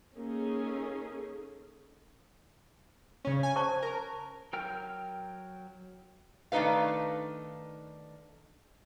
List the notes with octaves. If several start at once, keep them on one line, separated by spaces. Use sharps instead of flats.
A#3 C#4 D#4 G#4 A4
C#3 C#4
G#5
C5 A5 C#6
A#4
F#3 A#4 G5 F6
D#3 A3 D4 D#4 B4 F5